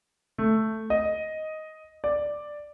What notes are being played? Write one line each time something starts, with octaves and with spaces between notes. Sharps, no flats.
A3
D#5
D5